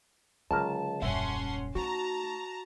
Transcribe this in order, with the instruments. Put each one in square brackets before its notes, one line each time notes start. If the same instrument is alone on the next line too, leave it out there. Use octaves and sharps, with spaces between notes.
[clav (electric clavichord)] C#2 A#4 [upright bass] D3 F#3 [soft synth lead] A5
[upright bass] D#1 F#2 [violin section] C#4 F#5 C6 [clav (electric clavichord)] E5
[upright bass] A3 D#4 [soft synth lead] F#4 [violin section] A5 A#5